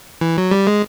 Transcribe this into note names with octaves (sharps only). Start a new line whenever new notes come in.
E3
F#3
G3
G#3